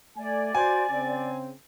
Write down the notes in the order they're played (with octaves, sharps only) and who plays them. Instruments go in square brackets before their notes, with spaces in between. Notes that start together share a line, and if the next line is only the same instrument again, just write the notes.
[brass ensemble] A3 G#5 [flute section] D5
[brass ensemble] F#4 C5 [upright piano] G#5
[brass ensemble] C#3 C4